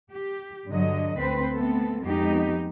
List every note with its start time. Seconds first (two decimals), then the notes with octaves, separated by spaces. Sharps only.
0.12 G4
0.68 G2 D3 F#3 D#5
1.16 D2 C4 B4 C5
1.54 A3 B3 C4 A4
2.02 F2 G#3 B3 D#4 G4